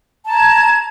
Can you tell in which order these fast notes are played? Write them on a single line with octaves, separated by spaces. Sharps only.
A5 A#5 G#6